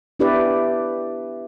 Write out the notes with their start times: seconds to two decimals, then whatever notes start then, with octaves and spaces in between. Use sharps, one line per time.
0.19 B3 D4 E4 G4 B4 D5